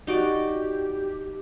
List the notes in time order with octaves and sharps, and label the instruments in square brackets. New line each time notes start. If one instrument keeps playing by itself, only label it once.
[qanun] D#4 F#4 D5 [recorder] G4